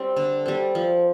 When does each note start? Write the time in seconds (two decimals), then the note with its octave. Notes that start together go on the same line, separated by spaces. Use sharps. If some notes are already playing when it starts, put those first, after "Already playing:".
Already playing: G3 C4
0.16 D3
0.46 G3 C4
0.75 F3